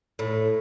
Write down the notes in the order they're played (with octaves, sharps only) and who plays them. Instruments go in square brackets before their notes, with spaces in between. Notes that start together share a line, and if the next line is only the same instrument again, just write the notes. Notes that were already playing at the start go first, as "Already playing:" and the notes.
[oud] A2